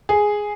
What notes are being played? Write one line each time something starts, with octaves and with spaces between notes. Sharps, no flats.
G#4